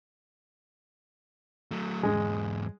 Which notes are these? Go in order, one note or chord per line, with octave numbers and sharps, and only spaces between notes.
F#3 A3
E2 G#2 G#3